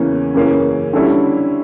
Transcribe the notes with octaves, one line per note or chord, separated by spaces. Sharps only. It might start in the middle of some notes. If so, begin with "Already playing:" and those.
Already playing: E2 C#3 E3 A#3 C#4
F#2 C#3 E3 A#3 C#4
D3 G3 C#4 E4